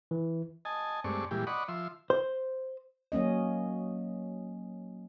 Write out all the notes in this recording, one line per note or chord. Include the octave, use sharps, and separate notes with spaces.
E3
D#5 G#5 A5
G2 G#3 A3 C4 D5 C#6
A#2 E3 G3 G#3 G4
D5 D#5 F#5 B5 C#6
F3 E5 C6
C5
F#3 A#3 C#4 D#5